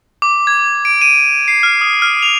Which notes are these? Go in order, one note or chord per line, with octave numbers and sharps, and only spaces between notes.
D6
G#6
D7
D#7
C7
F6
D#6
F6
F7